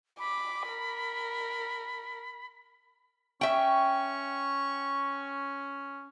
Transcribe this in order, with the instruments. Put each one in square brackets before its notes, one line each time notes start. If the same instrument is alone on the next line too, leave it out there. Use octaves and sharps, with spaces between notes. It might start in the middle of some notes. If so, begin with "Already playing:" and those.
[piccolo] B5 [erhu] D6
[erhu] A#4
[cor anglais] C#4 [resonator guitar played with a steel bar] E5 G5 [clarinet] C#6